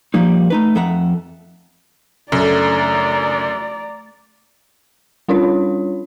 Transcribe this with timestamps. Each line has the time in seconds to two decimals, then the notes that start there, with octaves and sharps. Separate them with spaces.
0.14 F3 G3 A#3 D#4
0.50 A3 D#4 B4
0.75 F2 A4 E5 F#5 A#5
2.32 F#2 C#3 A3 D4 D5 A#5
5.28 G3 C#4 D4 F4 C#5